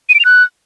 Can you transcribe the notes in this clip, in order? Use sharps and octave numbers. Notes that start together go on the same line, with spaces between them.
D#7
D7
F7
F#6